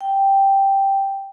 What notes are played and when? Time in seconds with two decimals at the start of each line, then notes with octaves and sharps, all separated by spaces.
0.01 G5